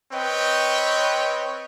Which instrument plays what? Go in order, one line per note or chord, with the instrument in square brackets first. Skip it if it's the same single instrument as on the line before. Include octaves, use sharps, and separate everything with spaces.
[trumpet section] C4 B4 C#5 D#5 G5